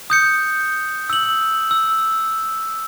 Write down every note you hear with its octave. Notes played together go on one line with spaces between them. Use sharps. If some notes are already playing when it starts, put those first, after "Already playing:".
D#6 G6 C#7
E6 F#7
E6